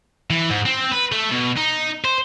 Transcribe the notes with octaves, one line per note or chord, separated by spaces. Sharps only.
E3
G#2
C4
B4
A3
B2
D#4
C5